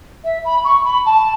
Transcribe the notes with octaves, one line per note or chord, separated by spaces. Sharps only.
E5
B5
C#6
B5
A5